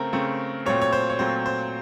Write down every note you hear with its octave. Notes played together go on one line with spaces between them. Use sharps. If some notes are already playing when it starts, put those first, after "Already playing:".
Already playing: C#3 A3 C4 A#4
C#3 A3 C4
A#2 F#3 A3 C4 C#5
C#5
C5
C#5
A#2 F#3 A3 C4 C5
C5